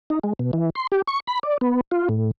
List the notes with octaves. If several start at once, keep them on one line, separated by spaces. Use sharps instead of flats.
D#4
G#3
B2
E3
C6
G4
C#6
B5
D5
B3
F4
A2